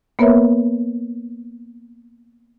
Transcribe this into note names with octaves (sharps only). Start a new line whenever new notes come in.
A#3 B3 A#4 B4 C#5 E5